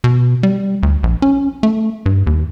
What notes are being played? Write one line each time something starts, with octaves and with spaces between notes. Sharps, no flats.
B2
G3
D2
A#1
C#4
A3
G2
D#2